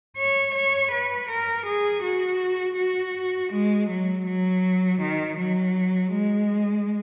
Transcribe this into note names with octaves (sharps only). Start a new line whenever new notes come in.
C#5
C#5
B4
A#4
G#4
F#4
F#4
G#3
F#3
F#3
D#3
F#3
G#3